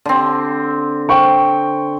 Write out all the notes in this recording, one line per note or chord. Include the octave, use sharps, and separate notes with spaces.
D3 C4
C5 G5 C#6